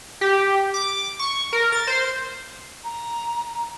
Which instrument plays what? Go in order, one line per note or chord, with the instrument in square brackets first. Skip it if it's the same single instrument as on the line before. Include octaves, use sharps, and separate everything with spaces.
[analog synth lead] G4
D6
C#6
A#4
A6
C5
[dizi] A#5